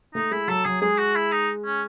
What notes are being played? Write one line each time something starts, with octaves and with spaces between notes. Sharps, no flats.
A3 D#4
G#3 E4
F#3 A4
F#3 G#4
G#3 G#4
F#4
E4
D#4
C#4